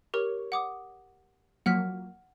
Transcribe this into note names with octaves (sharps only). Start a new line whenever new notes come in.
G4 A#4 C#5
F#5 D6 D#6
F3 F#3 A#3 F#5 F6 B6